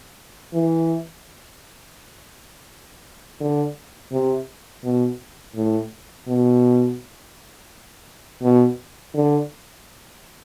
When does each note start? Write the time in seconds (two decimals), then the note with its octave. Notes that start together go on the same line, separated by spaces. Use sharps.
0.54 E3
3.41 D3
4.12 C3
4.84 B2
5.56 A2
6.28 B2
8.43 B2
9.15 D3